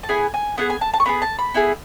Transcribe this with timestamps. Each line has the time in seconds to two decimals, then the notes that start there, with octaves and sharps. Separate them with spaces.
0.03 A5
0.09 B3 E4 G#4 G#5
0.34 G#5
0.58 B3 E4 G#4 F#5
0.70 G#5
0.81 A5
0.94 A5
1.00 C#6
1.06 B3 E4 G#4 B5
1.22 A5
1.39 B5
1.54 B3 E4 G#4